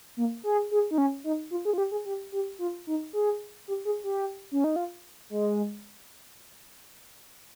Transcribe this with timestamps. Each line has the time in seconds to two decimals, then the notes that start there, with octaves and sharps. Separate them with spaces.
0.17 A#3
0.44 G#4
0.71 G#4
0.91 D#4
0.98 C#4
1.24 D#4
1.51 F4
1.65 G#4
1.73 F4
1.78 G4
1.92 G#4
2.05 G4
2.32 G4
2.59 F4
2.87 D#4
3.13 G#4
3.68 G4
3.85 G#4
4.04 G4
4.51 C#4
4.64 D#4
4.76 F4
5.30 G#3